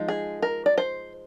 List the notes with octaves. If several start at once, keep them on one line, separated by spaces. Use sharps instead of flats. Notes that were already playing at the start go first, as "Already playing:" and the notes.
Already playing: F3 G#3 D#4
G#4
A#4
D5
C5